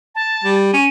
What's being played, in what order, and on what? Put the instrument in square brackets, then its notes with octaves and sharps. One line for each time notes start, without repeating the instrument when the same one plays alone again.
[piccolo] A5
[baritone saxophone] G3
[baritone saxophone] C#4 [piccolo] D#7